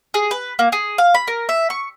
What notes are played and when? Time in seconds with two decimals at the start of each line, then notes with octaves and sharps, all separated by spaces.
0.14 G#4
0.31 B4
0.59 A#3
0.72 G#4
0.98 F5
1.14 B5
1.28 A#4
1.49 E5
1.70 C#6